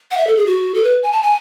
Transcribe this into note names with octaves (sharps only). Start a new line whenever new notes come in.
F#5
E5
A4
G#4
F#4
A4
B4
G#5
A5
G#5